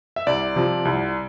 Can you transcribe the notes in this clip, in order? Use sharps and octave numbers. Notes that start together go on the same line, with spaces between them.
E5
C2 D5
C3 F3
C2